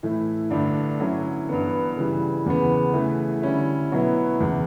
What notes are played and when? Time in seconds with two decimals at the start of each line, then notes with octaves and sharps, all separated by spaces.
0.03 A2 E3 A3 E4
0.50 G2 D3 A3 D4
1.00 D3 F#3 C#4 E4
1.49 G2 E3 B3
1.97 C#3 E3 G3
2.46 E2 C#3 E3 B3
2.93 C#3 E3 A3
3.42 D3 G3 C#4 E4
3.92 B2 F#3 B3 E4
4.40 E2 C#3 E3